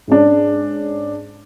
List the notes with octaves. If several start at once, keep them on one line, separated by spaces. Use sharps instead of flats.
G#2 C#4 D4